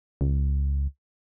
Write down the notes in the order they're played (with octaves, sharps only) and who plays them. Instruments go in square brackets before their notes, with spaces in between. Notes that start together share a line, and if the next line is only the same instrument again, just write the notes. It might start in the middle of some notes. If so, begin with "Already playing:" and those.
[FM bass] C#2